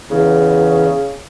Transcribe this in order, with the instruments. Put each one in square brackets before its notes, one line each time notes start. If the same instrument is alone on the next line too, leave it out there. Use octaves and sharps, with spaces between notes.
[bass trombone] E2 [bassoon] C#3